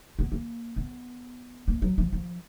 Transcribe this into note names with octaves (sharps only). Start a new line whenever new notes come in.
B3
A#3
B3
A#3
F#3
F3
F3